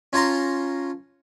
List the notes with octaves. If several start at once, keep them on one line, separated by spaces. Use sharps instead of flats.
C#4 F4 A5 A#5 C6